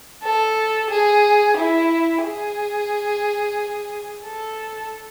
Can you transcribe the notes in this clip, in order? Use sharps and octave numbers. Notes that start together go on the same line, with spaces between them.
A4
G#4
E4
G#4
A4